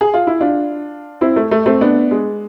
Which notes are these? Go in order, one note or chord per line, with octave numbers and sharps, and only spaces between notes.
G#4
F4
E4
D4 F4
C4 E4
A3
A3
A3 C4
B3 D4
G#3